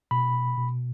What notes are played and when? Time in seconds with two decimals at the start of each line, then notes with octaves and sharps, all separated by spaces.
0.11 B2 B5
0.58 B2